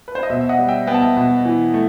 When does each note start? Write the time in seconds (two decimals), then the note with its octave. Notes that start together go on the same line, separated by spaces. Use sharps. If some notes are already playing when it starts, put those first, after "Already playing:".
0.08 B4
0.15 C5
0.23 D#5
0.30 B2 C5 E5
0.41 E5
0.49 D#5 F#5
0.59 G3
0.68 E5 G5
0.87 B3 G5
0.94 A5
1.02 E5 G5
1.17 B2
1.45 E3
1.74 A3